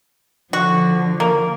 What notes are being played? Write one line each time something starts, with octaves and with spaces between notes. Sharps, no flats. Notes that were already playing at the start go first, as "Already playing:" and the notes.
D3 F3 F#4
A#3